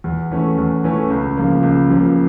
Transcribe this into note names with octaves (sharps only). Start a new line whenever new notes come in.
E2
E3 A3 C#4
E2
E3 A3 C#4
C#2
C#3 F3 A#3
C#2
C#3 F3 A#3